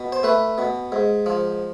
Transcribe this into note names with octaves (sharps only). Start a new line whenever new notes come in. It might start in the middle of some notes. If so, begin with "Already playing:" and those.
Already playing: B2
C5
A3 B4
B2
G#2
F3